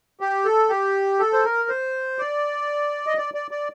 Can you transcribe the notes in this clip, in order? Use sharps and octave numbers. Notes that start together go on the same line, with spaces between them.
G4
A4
G4
A4
C5
A#4
C5
D5
D#5
D5
D5
D5